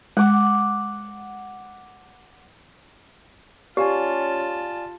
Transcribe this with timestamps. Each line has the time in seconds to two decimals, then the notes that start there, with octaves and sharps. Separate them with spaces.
0.17 G#3 F#5 D6
3.77 C#4 F4 G4 D5 F5 G#5 A5